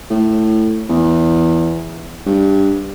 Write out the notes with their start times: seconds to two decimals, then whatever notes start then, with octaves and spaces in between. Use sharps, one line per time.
0.10 A2
0.89 E2
2.26 G2